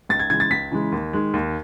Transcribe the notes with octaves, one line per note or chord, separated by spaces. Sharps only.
C#2 A6
G#6
C#3 E3 G#3 G#6
A6
C#2 B6
C#3 E3 G#3
D#2
D#3 G#3
D#2